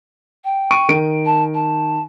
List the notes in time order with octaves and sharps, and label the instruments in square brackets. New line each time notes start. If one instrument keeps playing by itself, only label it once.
[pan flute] G5
[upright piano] C#6 D7 D#7
D#3 D7
[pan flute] A5
A5